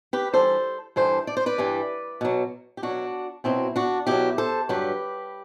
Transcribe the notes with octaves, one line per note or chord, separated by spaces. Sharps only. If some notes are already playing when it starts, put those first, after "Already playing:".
G4 B4
G2 E3 G3 A4 C5
G2 E3 G3 A4 C5
D5
C5
B4 D5
G2 E3 G3
B2 F#3
G4
B2 F#3 D4 F#4
B2 F#3 C4 E4
D4 F#4
B2 F#3 E4 G4
A4 C5
G2 D3 F#3 G4 B4